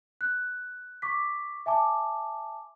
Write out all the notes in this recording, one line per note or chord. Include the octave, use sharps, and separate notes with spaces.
F#6
C#6 D6 B6
E5 G#5 A5 D6